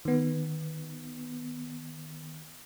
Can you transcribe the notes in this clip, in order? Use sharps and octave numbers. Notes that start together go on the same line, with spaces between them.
D#3 B3